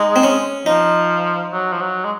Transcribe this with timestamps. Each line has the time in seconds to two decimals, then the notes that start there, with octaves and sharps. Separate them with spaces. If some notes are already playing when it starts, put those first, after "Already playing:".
Already playing: G#3 D#4
0.16 C4
0.23 C#4
0.66 F3 D#4
1.52 F#3
1.72 F3
1.81 F#3
2.04 G#3